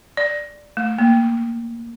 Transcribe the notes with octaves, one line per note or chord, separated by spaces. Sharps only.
D5
A3
A#3